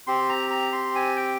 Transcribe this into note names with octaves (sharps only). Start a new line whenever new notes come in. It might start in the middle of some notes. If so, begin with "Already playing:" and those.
C4 G4 C6
A#5
A#5
C6
G#5
G5